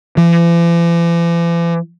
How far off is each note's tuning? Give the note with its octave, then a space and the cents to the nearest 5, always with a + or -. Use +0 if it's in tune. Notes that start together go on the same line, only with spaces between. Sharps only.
E3 +45